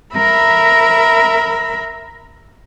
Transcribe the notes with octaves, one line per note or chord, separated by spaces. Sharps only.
A#4 E5 A#5 B5